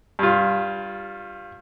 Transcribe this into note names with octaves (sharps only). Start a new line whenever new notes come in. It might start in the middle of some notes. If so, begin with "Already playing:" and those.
G2 F4